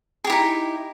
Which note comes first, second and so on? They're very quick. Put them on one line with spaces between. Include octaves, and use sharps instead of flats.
G#4 G4 E4 D#4